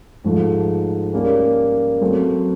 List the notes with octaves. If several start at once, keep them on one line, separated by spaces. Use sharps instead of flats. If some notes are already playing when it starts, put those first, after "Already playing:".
G#2 F3 A3
G3 A#3 C#4
F#3 A3 C4